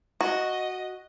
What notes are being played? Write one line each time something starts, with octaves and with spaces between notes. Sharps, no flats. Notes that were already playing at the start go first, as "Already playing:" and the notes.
F#4 D#5